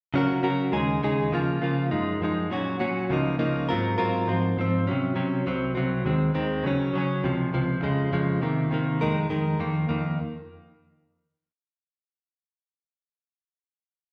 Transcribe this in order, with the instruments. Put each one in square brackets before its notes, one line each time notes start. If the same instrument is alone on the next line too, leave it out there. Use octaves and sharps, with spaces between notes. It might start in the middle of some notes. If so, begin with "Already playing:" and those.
[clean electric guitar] C#3 F#3 C#4 F#4 A#4
C#3 F#3 C#4 F#4 A#4
D#2 C#3 G#3 D#4 G#4
D#2 C#3 G#3 D#4 G#4
C#3 F3 A#3 F4
C#3 F3 A#3 F4
F#2 F3 G#3 D#4
F#2 F3 G#3 D#4
A#2 F#3 C#4 F#4
A#2 F#3 C#4 F#4
C#2 C#3 F3 A#3 D#4
C#2 C#3 F3 A#3 D#4
G#2 F#3 C4 F4 A#4
G#2 F#3 C4 F4 A#4
G#2 F3 C4
G#2 F3 C4
C3 F#3 C#4
C3 F#3 C#4
C2 C3 F#3 C4
C2 C3 F#3 C4
D#2 D#3 G#3 C4
D#2 D#3 G#3 C4
C#3 F#3 C#4
C#3 F#3 C#4
C#2 C3 F3
C#2 C3 F3
F2 C#3 F3 G#3
F2 C#3 F3 G#3
C3 D#3 A#3
C3 D#3 A#3
F2 D#3 G#3 D#4 A#4
F2 D#3 G#3 D#4 A#4
F2 D#3 A#3
F2 D#3 A#3